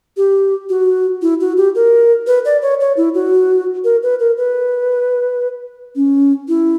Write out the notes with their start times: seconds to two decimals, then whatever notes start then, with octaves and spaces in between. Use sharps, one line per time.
0.17 G4
0.70 F#4
1.22 E4
1.40 F#4
1.57 G4
1.75 A#4
2.27 B4
2.45 D5
2.62 C#5
2.80 C#5
2.97 E4
3.15 F#4
3.84 A#4
4.03 B4
4.20 A#4
4.38 B4
5.96 C#4
6.48 E4